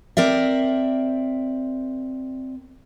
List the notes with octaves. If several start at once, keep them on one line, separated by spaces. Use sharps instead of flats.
C4 A#4 D5 E5